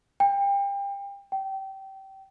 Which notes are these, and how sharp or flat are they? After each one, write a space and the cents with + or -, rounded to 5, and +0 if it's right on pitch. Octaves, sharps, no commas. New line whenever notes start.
G5 +30
G5 -25